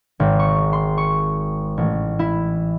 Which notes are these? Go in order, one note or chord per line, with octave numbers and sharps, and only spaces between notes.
G#1
C#6
C6
C#6
A1
E4